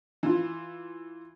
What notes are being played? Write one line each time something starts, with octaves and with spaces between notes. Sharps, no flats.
E3 F4